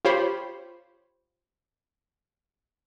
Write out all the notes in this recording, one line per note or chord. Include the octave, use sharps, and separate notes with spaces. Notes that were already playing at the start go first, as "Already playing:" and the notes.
F4 G4 C5 C#5 B5